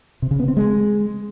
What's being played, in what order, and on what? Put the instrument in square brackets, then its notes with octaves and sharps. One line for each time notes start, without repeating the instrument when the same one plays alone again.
[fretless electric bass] C3
C#3
B3
C4
G#3